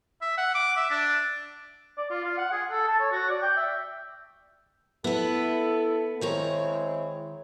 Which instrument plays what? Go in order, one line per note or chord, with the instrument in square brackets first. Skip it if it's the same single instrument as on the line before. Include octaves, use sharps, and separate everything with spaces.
[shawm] E5
F#5
D6
E5
D4
[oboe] D5
F4
F4
F#5
G#4
A4
A5
C#5
F#4
D5
G5
E5
[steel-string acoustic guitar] B3 B4 [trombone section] E4 A4
[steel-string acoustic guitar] D#3 C#5 A#5 [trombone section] G#3 C4 E4